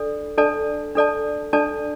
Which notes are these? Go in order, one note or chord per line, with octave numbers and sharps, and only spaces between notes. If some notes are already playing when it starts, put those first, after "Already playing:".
Already playing: D4 A4 D5
D4 A4 D5 A5
D4 A4 D5 A5
D4 A4 D5 A5